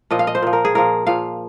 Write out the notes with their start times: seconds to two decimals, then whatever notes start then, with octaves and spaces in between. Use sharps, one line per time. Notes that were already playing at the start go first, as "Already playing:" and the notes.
0.11 A#2 F3 D#5
0.19 F5
0.27 D#5
0.35 C5
0.42 A#2 F3
0.53 A#4
0.65 G#4
0.75 A#2 F3 A#4
1.07 A#2 F3 F5